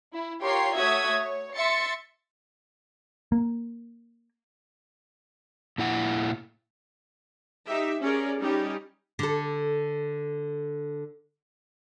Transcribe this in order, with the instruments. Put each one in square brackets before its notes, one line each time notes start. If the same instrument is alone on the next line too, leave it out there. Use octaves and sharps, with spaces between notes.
[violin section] E4
F4 G4 A#4 C#5 C6 C7
A3 F#4 C#5 E5 D#6 G#6
C#5
E5 C6 A6 C#7
[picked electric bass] A#3
[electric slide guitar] A#2 E4 F#5
[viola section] D#4 G4 E5
C#4 G#4 A#4 D5
G3 C#4 D#4 G4
[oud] D3 A4